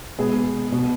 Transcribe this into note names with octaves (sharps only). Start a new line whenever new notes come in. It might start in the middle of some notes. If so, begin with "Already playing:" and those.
B2 G#3 B3 G#4
B2 B3